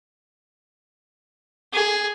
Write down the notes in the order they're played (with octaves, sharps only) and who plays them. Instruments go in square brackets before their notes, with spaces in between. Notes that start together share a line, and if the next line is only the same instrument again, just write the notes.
[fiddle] G#4